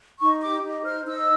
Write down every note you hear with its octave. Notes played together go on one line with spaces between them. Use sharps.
D#4 C#6
G4 D6
D#4
C5 F6
D#4 E6